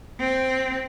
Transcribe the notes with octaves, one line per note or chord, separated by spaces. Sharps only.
C4